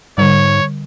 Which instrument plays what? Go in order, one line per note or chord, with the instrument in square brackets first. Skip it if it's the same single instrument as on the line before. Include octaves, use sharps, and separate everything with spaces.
[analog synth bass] G#2 [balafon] D3 G3 [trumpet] C#5